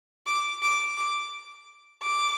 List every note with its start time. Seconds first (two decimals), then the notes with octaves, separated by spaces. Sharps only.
0.27 D6
0.62 D6
0.97 D6
2.02 D6